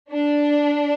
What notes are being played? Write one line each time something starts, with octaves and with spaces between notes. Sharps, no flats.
D4